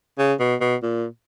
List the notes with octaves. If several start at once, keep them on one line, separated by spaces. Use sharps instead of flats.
C#3
B2
B2
A#2